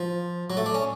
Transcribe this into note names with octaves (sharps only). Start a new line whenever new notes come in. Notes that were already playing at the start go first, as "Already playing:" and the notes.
Already playing: F3
F#3
A3
D4
C#4